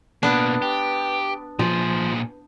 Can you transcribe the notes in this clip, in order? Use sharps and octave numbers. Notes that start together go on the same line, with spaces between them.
B2 A#3 B3 D4
G4
A#2 F3 G#4